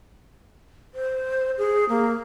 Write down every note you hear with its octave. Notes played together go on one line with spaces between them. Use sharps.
C5
G#4
A#3